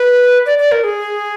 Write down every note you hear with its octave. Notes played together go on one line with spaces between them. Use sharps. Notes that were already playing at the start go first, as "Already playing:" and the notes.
Already playing: B4
D5
D5
A#4
G#4